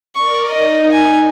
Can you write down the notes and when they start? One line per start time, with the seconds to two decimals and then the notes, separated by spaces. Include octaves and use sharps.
0.16 A#4 D5 C#6
0.50 D#4 D#5
0.92 G#5